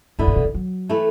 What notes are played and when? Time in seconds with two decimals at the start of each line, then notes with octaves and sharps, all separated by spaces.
0.19 F#2 D3 B3 E4
0.27 A2
0.36 B2
0.45 D3
0.54 F#3
0.89 E3 A3 E4 A4